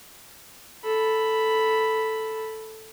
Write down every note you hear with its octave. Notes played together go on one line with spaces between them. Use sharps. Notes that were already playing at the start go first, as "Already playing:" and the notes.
A4 B5